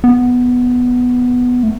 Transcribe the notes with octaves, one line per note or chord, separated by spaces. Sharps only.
B3
A3